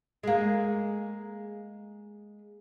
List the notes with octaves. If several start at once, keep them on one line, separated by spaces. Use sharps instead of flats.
G#3 A#3